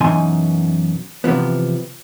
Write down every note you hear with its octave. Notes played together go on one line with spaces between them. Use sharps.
F#2 B2 E3 D#4 G#5 C6
C3 E3 F3 B3